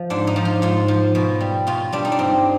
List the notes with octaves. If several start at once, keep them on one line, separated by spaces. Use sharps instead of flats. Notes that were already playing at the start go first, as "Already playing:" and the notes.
Already playing: F3
G#2 D4
D#4
F3
F4
G#2 F4
F3
B2
G3
B2 F4
G3 D4
D#4
D4
G2 C4